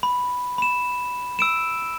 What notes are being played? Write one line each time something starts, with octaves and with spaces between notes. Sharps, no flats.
B5
B5 E7
E6 D7 E7